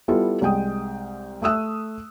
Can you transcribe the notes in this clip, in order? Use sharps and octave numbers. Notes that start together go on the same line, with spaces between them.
G3 B3 E4 F4 A4
C2 G#3 G5 D#6
A3 E5 D#6 E6 F#6